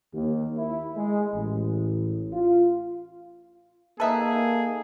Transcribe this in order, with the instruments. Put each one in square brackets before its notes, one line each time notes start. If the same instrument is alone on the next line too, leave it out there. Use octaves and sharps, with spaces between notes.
[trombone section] D#2
E4
G#3
A1
F4
[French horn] A#3 [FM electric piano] D#4 A4 [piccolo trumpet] G#4 [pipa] B4 E5